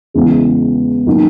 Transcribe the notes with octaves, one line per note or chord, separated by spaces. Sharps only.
E2 C#3 G#3 C#4 E4
D#3 F#3 A#3 C#4